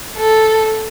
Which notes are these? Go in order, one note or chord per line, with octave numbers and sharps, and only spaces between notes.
A4